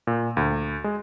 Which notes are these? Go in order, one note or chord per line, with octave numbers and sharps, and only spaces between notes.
A#2
D2
G#3